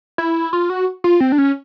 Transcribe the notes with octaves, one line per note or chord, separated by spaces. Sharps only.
E4
F4
F#4
F4
C4
D4
C#4